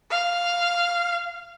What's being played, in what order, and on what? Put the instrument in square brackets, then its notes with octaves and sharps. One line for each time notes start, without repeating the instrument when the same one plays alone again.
[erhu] F5